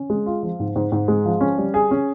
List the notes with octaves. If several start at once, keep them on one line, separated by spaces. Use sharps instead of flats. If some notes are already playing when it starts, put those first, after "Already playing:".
Already playing: C#4
G#3
F4
F3
G#2
G#2
G#2
G#3
F3
C#4
G3
G#4
C#4